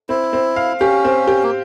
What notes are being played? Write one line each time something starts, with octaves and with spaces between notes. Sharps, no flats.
C4 E4
C4
F5
C#4 G4
C4
G4
A#3